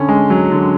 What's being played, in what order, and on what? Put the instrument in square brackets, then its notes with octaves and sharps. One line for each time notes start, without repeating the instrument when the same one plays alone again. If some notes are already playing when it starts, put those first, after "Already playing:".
Already playing: [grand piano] D3 C#4
G#3
F#3
D3